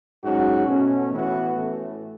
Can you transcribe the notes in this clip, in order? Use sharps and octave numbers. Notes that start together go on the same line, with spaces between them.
G#2 F#3 C#4 F#4
B2 A3 C#4
A1 A2 E3 B3 F#4
A1 A2 E3 A3